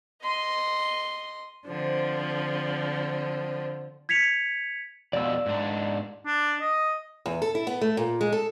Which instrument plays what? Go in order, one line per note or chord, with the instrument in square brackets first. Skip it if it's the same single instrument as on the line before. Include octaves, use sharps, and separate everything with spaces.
[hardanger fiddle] D#5 C6
[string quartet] D3 F3 C4
[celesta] G#6 B6 C#7 F7
[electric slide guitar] F2 B2 [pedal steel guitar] D5 E6
[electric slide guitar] G#2 D4
[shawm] D4
D#5
[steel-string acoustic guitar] E2
A4
E4
B3
A3
A#2
G#3
A4